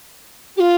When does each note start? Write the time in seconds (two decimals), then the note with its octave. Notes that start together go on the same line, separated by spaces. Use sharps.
0.56 G4
0.59 F4